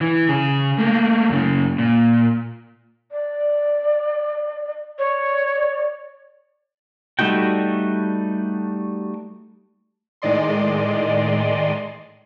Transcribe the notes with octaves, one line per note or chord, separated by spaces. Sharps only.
E3
C#3 G#4
A3 A#3
F#2 C#3
A#2
D5
C#5 D5
G3 A3 D#4 F#4 G5
A2 D#3 G#3 D5 D#5 C6